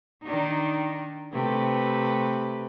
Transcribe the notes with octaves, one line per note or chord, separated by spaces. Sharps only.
D#3 D4 D#4
C3 A3 B4